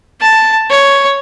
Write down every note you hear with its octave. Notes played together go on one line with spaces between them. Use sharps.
A5
C#5